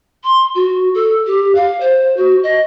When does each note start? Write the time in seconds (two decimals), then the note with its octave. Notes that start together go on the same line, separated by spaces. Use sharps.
0.24 C6
0.55 F#4
0.94 A4
1.27 G4
1.55 F5
1.80 C5
2.17 F#4
2.43 D#5